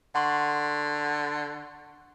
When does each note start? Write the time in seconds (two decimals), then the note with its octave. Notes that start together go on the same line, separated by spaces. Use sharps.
0.15 D3 F#5 C6 C#6